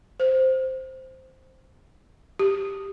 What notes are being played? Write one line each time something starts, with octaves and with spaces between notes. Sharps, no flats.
C5
G4